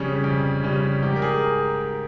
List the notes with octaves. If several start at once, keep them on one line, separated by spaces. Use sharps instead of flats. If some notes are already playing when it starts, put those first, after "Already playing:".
Already playing: F2 C#3 G3 C#4 G#4
F2
C#3 G3 C#4
G#2 G4
A#4
G#4